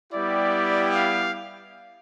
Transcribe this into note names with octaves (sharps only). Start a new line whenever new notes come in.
G3 B3 E4 G4 D5
F5